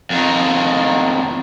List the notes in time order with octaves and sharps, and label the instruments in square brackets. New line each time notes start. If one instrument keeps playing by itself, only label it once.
[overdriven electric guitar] F2 D#3